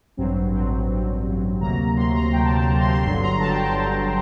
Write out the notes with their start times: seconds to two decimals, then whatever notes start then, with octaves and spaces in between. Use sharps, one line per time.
0.17 A1 G2 F#3 C4
0.53 A1 G2 F#3 C4
0.89 A1 G2 F#3 C4
1.25 A1 G2 F#3 C4
1.61 D2 C3 F#3 A#3 A#5
1.97 D2 C3 F#3 A#3 C6
2.15 A#5
2.32 D2 C3 F#3 A#3 G5
2.44 A5
2.56 A5
2.68 D2 C3 F#3 A#3 A#5
2.80 C6
2.92 C6
3.04 G1 G2 D3 F#3 C6
3.22 A#5
3.40 G1 G2 D3 F#3 A5
3.51 G5
3.62 A5
3.76 G1 G2 D3 F#3